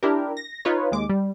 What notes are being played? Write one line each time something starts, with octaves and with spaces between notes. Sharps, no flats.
D4 E4 G4 A#4
A#6
D#4 F4 B4 C#5
D#2 G#3 D6
G3